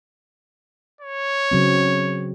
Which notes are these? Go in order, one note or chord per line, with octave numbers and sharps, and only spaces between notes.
C#5
C#3 F#3 C4